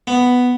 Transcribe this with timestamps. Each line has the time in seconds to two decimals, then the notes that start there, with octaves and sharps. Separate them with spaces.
0.07 B3